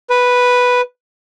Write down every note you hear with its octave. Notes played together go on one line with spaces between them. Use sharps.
B4